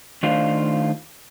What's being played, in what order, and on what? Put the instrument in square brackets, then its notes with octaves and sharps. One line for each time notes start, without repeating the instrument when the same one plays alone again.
[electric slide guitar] D#3 A3 D4 F4 C5 F5